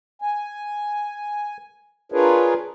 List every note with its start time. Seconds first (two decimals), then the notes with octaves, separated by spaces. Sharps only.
0.22 G#5
2.12 D4 F4 G#4 A#4 B4 C#5